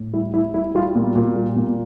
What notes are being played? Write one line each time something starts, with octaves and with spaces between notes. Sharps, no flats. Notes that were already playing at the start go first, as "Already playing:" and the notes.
Already playing: A2
G3 E4
G3 E4
G3 E4
G3 F4
A#2
A#2
G3
A#2